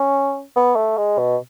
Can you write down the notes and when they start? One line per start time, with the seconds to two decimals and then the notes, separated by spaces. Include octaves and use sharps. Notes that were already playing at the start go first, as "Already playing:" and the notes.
Already playing: C#4
0.56 B3
0.76 A3
0.97 G#3
1.18 B2